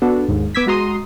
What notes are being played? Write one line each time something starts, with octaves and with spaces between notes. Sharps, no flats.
B3 D4 F#4 A4
D#2 G#2
B3 D6 E6 G#6 B6
G#3 F#4 A#5 C6 D#6